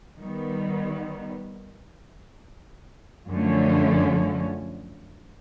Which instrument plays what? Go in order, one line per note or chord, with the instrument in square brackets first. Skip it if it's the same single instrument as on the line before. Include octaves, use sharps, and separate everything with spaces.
[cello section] D#3 G3 B3
F#2 D3 F3 A3 C#4